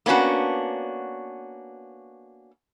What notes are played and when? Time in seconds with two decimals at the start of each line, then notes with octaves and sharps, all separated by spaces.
0.06 A#3 B3 C#4 D4 F#4